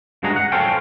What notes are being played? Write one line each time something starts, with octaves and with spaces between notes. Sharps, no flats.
G2 C#3 G#3 F#4 G#4 A#5
F#5
A4 C5 C#5 F5 G5 G#5